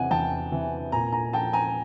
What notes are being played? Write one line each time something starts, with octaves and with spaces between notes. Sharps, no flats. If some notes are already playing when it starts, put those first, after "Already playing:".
Already playing: E2 C3 E3 F#5 G#5
E2 G5 A5
C3 E3
A#2 G#5 A#5
G#5 A#5
F3 G5 A5
G#5 A#5